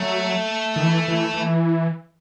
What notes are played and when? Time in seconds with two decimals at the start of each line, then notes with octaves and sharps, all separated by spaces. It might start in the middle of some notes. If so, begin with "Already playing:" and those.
Already playing: F#3 A3
0.76 D#3
0.82 E3
1.08 E3
1.34 E3